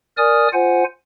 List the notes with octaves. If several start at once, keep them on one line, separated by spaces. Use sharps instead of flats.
A#4 D5 G#5 D#6 F6
F4 C5 F#5 G#5